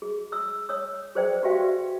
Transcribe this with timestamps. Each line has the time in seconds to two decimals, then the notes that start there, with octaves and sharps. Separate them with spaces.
0.02 G#4
0.32 D#6 E6
0.69 C#5 D#6 E6
1.15 G#4 B4 C5 D5 G5
1.43 F#4 G4 B4 E5 F5 G5